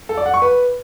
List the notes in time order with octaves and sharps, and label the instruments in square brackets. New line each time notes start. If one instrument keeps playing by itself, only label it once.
[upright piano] A4
D5
F#5
C#6
B4